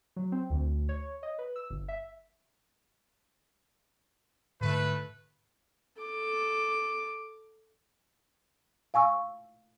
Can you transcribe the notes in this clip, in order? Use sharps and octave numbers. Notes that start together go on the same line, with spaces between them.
F#3
C4
D2
C#5
D#5
B4
E6
G1
E5
G#2 D3 A3 B4
A4 D6
F5 G#5 C#6 E6